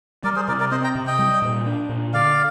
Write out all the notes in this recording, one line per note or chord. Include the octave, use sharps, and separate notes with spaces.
G3 A#4 D5
G#4 C5
C3 A#4 D5
A#4 D5
C4 C5 D#5
G5 A#5
C3
D#5 G5
G3
A#2
D4
A#2
D3 D5 F5